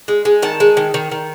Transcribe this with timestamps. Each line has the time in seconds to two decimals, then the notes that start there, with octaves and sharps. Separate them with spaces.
0.08 G#3
0.25 G#3
0.42 D#3 A5
0.60 G#3
0.77 D#3
0.94 D#3
1.11 D#3